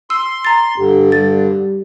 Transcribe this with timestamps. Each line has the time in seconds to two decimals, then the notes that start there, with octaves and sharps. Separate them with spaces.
0.10 C6 E6
0.45 A#5 A6
0.78 G2 D3 G4
1.12 G3 A6